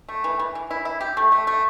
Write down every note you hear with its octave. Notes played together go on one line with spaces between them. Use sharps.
A3
E3
E3
E3
E4
E4
G4
A3
A3
A3